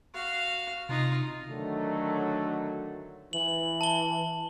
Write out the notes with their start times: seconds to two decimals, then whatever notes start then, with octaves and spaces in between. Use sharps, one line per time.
0.14 F#4 F5
0.89 C3 D#4 F4
1.49 D3 D#3 F#3 A3
3.33 E3 F#7
3.81 A5 G7